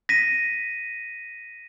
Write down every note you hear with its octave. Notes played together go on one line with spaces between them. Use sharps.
A#6 B6 D#7